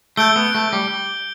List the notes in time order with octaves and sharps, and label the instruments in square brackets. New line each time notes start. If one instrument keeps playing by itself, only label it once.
[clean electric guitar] A3 [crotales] G6 D7 G7
[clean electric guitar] B3
A3
G3